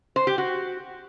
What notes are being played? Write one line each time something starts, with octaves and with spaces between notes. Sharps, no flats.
C5
G4
F#4